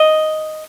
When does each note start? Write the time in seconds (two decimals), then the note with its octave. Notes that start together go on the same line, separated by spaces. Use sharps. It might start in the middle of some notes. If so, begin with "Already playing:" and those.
Already playing: D#5